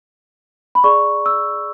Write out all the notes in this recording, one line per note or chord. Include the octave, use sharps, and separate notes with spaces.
B5
G#4 D5 C#6
E6